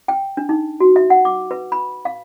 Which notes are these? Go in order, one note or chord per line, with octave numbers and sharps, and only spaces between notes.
G5
D4
D#4
F#4
E5
F#5
D6
B4
B5
F5